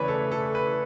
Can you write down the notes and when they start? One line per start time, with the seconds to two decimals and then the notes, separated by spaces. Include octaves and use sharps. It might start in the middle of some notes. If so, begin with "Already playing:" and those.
Already playing: E2 C#3 E3 A3 B4 C#5 D5
0.08 A4
0.32 A4
0.55 B4